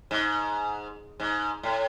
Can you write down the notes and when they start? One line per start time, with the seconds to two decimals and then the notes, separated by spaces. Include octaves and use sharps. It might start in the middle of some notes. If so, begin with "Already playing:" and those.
0.11 G#2
1.20 G#2
1.63 A2